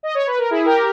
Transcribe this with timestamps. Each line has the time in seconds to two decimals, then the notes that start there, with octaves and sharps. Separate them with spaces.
0.03 D#5
0.15 C#5
0.27 B4
0.38 A#4
0.50 E4 G#4
0.65 G4 A#4